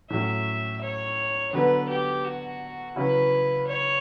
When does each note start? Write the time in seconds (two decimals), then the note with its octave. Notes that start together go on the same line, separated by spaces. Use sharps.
0.10 A2 F#3 C#4 E5
0.81 C#5
1.53 D3 F#3 B3 B4
1.89 G4
2.24 F#4
2.96 C#3 F#3 C#4 E4 B4
3.67 C#5